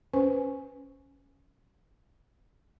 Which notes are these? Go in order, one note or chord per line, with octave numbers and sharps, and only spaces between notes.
C#4 B4 C5 G#5